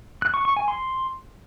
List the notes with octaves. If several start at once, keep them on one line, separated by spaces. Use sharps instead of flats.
F#6
C#6
C#6
G#5
C6